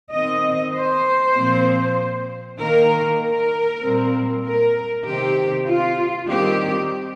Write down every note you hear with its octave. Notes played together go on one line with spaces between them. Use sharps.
D#3 C4 D#5
C5
A#2 F3 C4
D#3 A#3 A#4
A#4
A#2 G3 C4
A#4
C3 D#3 C4 G4
F4
D#3 G3 C4 G4